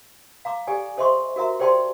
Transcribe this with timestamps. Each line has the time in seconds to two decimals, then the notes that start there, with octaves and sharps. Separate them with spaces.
0.45 F5 A#5 D6
0.67 G4 A4 D5 G#5
0.97 A4 C5 D#5 E5 C6 C#6
1.36 F#4 A#4 E5 A#5
1.59 G4 C5 D5 G5 A5 C6